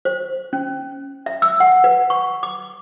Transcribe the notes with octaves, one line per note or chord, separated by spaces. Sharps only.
C5
C#4
E5
E6
F#5
B4
C#6
D6